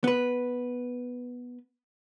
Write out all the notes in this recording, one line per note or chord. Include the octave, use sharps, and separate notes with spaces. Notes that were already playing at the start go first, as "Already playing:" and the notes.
B3 B4